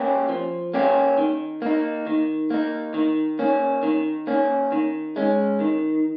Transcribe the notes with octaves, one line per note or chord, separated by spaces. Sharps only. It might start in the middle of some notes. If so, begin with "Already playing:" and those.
Already playing: A#3 C#4 G4
F3
A#3 C#4 G4
D#3
A#3 D#4
D#3
A#3 D#4
D#3
A#3 C#4
D#3
A#3 C#4
D#3
G#3 C#4
D#3